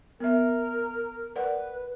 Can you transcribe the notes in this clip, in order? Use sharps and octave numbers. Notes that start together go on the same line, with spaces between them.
B3 A#4 E5
A#4 B4 D5 F#5